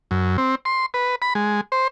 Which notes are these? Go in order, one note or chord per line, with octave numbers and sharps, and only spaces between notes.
F#2
C4
C6
B4
B5
G#3
C5